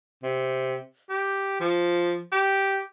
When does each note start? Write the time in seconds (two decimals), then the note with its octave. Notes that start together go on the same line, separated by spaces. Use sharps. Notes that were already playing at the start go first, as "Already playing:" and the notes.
0.23 C3
1.10 G4
1.61 F3
2.32 G4